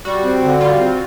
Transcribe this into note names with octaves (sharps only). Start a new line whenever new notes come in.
G3 F#4
C4
D3
G3 F4
C4